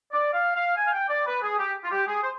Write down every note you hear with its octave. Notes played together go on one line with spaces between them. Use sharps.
D5
F5
F5
G#5
F5
G5
D5
B4
G#4
G4
F4
G4
G#4
C5